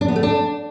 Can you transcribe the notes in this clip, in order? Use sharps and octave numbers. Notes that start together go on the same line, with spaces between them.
D4
B3
A3
D4